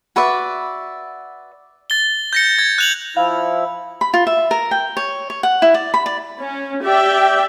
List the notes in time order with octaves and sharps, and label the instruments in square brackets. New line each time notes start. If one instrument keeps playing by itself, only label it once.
[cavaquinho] F#4 B4 D5 E5
[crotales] A6 G7
G6 A#6 C#7
G#6
F#6 F7 F#7
[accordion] F3 E4 [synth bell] F5
[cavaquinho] B5
F4
E5
A#4
G5
C#5
C#5
F#5
E4
D5
B5
D5
[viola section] C#4
G4 D5 E5 G5